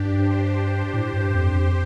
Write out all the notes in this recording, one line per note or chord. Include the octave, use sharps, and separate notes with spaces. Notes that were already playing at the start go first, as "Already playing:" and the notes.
Already playing: G2 D4 G4
G4 C5
A2 G4 C5
G2
F2
F2